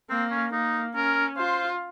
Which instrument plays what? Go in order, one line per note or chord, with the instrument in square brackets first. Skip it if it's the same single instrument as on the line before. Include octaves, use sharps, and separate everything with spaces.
[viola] A#3 [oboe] C4
[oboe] C#4
[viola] A#3 [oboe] D#4
[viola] C#4 [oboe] A#4
[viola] F4 [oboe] C5